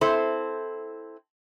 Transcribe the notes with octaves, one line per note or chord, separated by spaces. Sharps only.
C4 E4 A4 C5